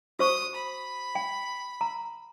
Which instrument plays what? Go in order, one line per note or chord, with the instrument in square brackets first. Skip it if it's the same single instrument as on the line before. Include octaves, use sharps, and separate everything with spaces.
[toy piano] F#4 C5 C#6 [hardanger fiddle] D#6
[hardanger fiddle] B5
[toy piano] G5
A#5